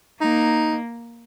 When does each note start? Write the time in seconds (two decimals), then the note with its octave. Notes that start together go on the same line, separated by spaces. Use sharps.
0.21 A#3 D#4